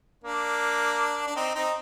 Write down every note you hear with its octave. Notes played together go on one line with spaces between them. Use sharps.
A#3 D4
D4
C4 D#4
C4 D#4